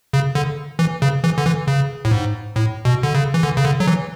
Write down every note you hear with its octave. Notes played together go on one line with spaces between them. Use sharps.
C#3
D3
E3
C#3
E3
D3
E3
C#3
A2
G#2
A2
B2
D3
C#3
E3
D3
C#3
D3
F#3
E3